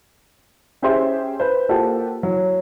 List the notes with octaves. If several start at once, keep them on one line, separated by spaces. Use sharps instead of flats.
C#4 G4 G#4 C5 E5 C6
B4 C5
A#3 F4 G4 A4 C5 F#5
F#3